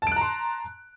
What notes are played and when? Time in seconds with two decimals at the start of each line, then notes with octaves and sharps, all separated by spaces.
0.02 A5
0.07 D7
0.12 F#6
0.16 A#5
0.21 C6